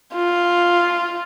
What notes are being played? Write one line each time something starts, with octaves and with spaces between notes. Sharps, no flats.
F4